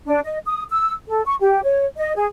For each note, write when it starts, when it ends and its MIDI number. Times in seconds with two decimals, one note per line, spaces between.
0.06 0.20 62
0.24 0.38 75
0.47 0.64 87
0.70 0.93 88
1.08 1.21 69
1.25 1.35 85
1.41 1.61 67
1.64 1.86 73
1.98 2.14 75
2.16 2.26 68